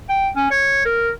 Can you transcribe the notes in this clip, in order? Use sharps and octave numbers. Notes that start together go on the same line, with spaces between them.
G5
C#4
C#5
A#4